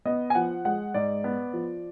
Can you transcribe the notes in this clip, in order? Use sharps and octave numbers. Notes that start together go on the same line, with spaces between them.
B3 D#5
G#5
F3 F#5
G#3 F#5
G#2 D5
B3
F3